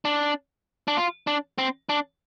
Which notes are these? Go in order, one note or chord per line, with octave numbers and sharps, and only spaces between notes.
D4
D4
F4
D4
C4
D4